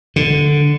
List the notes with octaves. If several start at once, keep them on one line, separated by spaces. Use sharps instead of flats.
D3